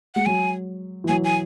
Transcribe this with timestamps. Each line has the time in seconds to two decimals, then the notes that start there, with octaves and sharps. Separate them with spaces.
0.15 G#3 F#5
0.26 F#3 G#5
1.04 E3
1.08 F#3 G#5
1.24 G#5